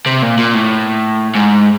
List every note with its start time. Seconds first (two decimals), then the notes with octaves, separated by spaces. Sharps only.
0.06 C3
0.22 A#2
0.38 A#2
0.54 A2
1.35 G#2